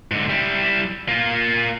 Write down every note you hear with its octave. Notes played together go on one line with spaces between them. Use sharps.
G#2 D3
G3 E4
A#3 F4